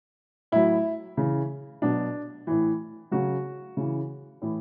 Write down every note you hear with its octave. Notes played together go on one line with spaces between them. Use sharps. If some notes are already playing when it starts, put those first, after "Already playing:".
A2 F#3 E4
C#3 E3
B2 F#3 D4
A2 E3
C#3 F#3 F#4
C#3 E3
A2 E3